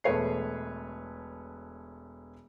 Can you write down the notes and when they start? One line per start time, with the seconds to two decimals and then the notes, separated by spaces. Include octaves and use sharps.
0.04 E1 A3 B4 C#5 C7